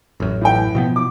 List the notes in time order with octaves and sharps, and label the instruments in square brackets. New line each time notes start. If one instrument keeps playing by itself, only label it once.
[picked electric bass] A1 F#2
[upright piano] A2 E3 G5
[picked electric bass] B2 F3 B3
[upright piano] D6